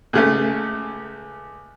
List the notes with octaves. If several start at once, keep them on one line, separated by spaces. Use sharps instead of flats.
C#2 C#3 A3